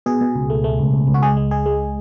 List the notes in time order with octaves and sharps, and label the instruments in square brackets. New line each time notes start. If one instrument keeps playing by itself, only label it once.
[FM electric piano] B2 G#4
B2
C#2
A3
A3
C#2
C#2
C#2
F#4
G#3 G#4
G#3
G#3 G#4
G#3